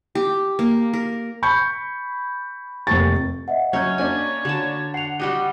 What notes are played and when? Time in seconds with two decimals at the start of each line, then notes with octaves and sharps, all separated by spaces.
0.15 G4
0.59 A#3
0.93 A#4
1.43 B5 C#6 G6 C#7
2.87 F1 A#3 C#6 A6
3.48 D#5 E5 F#5
3.73 F#3 C#4 C#5 G6
3.98 A#3 C#4 D4 G#5
4.45 D3 F#4 A5
4.94 F#5 C7 F7
5.19 G3 F#4 G4 D#5